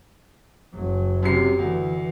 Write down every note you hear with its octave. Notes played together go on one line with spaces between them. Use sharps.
F#1 F#3
F#2 C3 C7
D2 E3